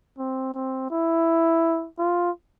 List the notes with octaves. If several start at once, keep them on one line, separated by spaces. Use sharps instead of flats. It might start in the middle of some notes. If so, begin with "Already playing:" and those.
C4
C4
E4
F4